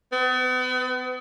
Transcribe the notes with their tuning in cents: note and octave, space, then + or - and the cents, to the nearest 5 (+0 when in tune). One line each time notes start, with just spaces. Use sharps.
B3 +40